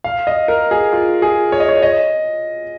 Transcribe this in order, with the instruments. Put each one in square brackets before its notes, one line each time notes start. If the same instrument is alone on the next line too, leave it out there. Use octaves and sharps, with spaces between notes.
[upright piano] F5
D#5
A#4
G#4
F4
G#4
C#5
D#5
C#5
D#5